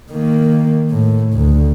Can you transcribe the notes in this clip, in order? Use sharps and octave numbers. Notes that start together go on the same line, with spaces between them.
D#3 A#3
A2
D2